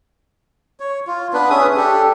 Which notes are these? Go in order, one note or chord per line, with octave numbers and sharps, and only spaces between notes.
C#5
F4
B3 D4 B4
C#4 G#4 E5 D#6
D4 G4 A4